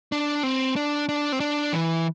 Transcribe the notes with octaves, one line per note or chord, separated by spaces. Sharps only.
D4
C4
D4
D4
C4
D4
E3